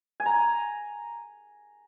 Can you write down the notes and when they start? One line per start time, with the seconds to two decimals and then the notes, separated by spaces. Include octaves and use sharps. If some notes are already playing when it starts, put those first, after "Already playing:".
0.20 G#5
0.26 A#5